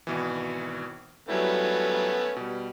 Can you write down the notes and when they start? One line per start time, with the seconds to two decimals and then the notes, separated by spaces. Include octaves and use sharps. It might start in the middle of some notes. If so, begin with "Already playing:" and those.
0.07 G#1 B2 E3
1.29 F#3 G3 A3 B3 C#4 E4
2.36 B2 G3